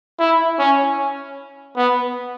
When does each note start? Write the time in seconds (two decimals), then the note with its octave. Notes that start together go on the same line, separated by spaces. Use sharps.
0.19 E4
0.59 C#4
1.76 B3